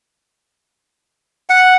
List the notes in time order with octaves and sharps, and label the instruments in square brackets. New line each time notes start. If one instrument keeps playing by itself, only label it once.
[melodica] F#5